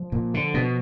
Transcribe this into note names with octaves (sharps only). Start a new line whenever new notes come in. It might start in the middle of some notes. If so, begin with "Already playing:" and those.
Already playing: F3
A#2
D3
B2